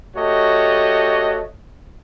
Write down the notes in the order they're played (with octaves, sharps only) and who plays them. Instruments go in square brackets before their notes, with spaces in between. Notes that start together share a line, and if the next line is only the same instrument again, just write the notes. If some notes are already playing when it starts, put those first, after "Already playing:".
[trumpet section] A3 F#4 G4 C#5 D#5 A5